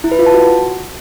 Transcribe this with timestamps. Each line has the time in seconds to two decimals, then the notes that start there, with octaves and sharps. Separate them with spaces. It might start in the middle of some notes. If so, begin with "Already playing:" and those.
0.04 E4
0.11 B4
0.19 F4
0.26 A5
0.34 F#4